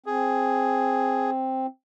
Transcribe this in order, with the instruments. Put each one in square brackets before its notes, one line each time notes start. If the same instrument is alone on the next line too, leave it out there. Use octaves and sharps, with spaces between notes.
[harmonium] C4 [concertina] G#4